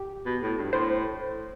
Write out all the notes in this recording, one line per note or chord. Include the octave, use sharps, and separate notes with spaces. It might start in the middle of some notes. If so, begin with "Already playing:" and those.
Already playing: G4
B2
A2
G2
A2 C5